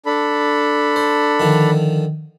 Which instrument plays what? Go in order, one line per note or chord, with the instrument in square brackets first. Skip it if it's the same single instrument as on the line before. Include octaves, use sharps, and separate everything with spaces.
[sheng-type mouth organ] D4 A4 B5
[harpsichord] C5
D3 D#3 F3